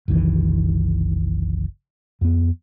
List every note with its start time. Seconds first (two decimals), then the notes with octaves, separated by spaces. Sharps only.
0.08 F#1 C2 D#3 E3
2.21 F2 B3